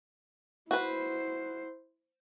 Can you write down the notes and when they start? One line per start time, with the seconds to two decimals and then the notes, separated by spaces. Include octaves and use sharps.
0.71 E4 F#4 B4 C5